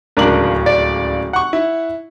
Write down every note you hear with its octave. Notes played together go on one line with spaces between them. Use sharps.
D1 C#2 D4 A#4 F#7
D5
F#5 C#6
E4